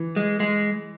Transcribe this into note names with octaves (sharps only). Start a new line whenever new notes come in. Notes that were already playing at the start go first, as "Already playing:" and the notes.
Already playing: E3
G#3
G#3